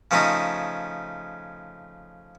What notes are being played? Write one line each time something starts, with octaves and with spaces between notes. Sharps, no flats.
C#3 F3 A3 C#4 D#4